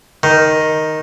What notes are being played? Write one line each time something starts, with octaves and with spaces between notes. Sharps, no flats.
D#3